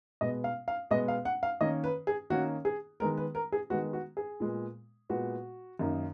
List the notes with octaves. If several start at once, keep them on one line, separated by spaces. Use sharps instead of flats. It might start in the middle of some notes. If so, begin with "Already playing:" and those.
B2 G#3 B3 D#5
F5
F5
B2 G#3 B3 D#5
F5
F#5
F5
D#3 A#3 C#4 D#5
B4
G#4
D#3 A#3 C#4 F#4
G#4
D#3 G#3 B3 A#4
B4
A#4
G#4
D#3 G#3 B3 F#4
F#4
G#4
A#2 G#3 B3
A#2 G#3 B3 F#4
F#2 D#3 A#3 D#4